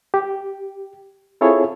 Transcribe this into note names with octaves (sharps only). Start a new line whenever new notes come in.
G4
C4 E4 F4 G#4 A4 C#5